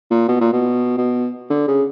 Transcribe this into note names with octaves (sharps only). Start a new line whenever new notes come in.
A#2
B2
A#2
B2
B2
D3
C#3